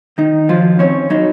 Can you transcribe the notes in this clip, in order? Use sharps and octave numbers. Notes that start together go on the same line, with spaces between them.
D#3 D#4
F3 F#3 F4
C4 C#4 C#5
F#3 D#4